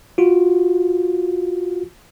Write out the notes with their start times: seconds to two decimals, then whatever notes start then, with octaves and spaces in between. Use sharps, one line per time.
0.18 F4 F#4